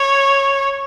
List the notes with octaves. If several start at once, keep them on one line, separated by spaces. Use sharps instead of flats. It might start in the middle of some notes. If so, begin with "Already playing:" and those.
Already playing: C#5